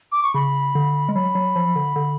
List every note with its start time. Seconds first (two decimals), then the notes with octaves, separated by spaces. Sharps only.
0.12 D6
0.23 C#6
0.34 C#3 B5
0.75 D3
1.09 G#3
1.15 F#3 B5
1.35 F#3
1.56 F3
1.76 D3
1.96 D3